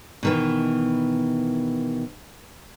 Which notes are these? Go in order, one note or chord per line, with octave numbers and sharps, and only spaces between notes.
B2 D#3 E3